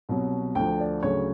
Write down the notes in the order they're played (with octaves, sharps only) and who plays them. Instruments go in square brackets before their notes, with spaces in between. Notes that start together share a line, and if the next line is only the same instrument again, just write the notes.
[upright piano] C2 B2 F#3
D2 D3 F3 G5
D5
D2 C#3 F#3 C#5